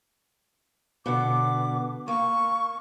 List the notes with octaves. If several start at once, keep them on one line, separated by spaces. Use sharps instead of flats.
B2 D3 B3 D6
A#3 C#6